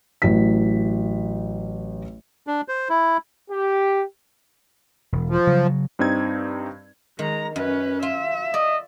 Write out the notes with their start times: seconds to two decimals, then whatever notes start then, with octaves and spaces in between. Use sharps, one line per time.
0.22 A1 F#3 E4 B6
2.47 D4
2.68 C5
2.89 E4
3.50 G4
5.12 E1
5.30 F3
5.47 C#3 F#3
5.99 G2 C4 D#4 G#6
7.19 D#3 G#3 A#5
7.56 F#2 C#4 B4
8.03 F4 E5
8.54 D5 D#5